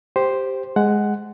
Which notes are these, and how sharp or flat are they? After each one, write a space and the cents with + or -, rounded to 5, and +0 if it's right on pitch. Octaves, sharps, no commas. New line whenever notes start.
G4 +0 C5 +0
G#3 +0 F#5 +10